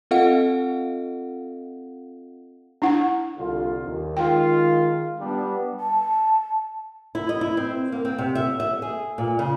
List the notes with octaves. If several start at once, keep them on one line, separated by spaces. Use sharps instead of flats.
C4 F4 A4 D#5 F5 F#5
D4 E4 F#5
C2 D3 F4
D#2
D#3 G#3 F4 G5
G3 B3 D4
A5
E4
D#5
E4
C4
A#3
C4
C3
E5
E5
G#4
A#2
C#3